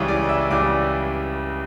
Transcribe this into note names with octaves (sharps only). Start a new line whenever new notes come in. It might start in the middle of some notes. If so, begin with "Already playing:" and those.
Already playing: C#2 C#3 E3 G3 C#5 C#6
D5 D6
E5 E6
C#2 C#3 E3 G3 D5 D6